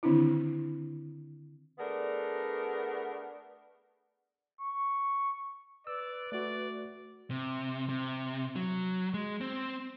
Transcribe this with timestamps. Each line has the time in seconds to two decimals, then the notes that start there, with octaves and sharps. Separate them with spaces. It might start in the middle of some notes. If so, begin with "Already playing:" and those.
0.03 D3 D#3 C4 D4 E4
1.79 A3 B3 D4 G#4 A#4
4.61 C#6
5.87 B4 D5 E6
6.32 A3 F#4 D5
7.31 C3
7.89 C3
8.56 F#3
9.14 G#3
9.41 C4